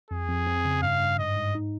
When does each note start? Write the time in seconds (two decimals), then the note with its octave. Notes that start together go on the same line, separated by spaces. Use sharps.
0.10 F2 G#4
0.28 F2
0.47 C4
0.65 C#3
0.82 G2 F5
1.00 G2
1.18 G#2 D#5
1.36 G#2
1.55 D#4